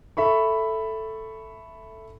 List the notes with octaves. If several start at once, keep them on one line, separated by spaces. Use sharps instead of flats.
A4 E5 B5 C#6